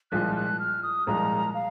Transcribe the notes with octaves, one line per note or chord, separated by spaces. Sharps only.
C2 A#2 F3 G#3 F#6
F#6
F6
D#6
C2 A#2 F3 G#3 A#5
F5